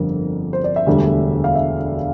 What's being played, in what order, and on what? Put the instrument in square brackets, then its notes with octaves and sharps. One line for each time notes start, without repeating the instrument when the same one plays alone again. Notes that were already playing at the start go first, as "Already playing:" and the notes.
Already playing: [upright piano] G1 F2 D3 G3 A#4
C5
D5
E5
E1 D2 D3 G3
F5
E5